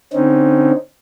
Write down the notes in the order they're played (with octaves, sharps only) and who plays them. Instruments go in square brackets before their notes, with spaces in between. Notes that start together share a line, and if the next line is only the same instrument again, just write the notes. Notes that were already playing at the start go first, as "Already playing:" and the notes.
[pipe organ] D3 C4 C#4 D#4